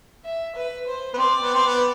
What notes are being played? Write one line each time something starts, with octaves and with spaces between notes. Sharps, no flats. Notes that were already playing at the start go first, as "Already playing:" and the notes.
E5
B4
C5
B3
C4 D5
B3
C4
B3